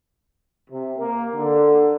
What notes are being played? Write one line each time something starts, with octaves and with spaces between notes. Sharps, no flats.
C3
A#3
D3